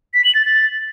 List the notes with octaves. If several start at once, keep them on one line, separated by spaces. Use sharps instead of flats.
B6
F#7
A6
A6